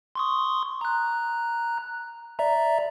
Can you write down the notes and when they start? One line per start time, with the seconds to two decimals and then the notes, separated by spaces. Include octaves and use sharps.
0.15 C6 C#6 D#6
0.81 A#5 F#6
2.39 D5 E5 A#5